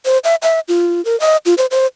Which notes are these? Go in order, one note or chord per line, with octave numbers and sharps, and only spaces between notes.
C5
E5
E5
F4
A#4
D#5
F4
C5
C5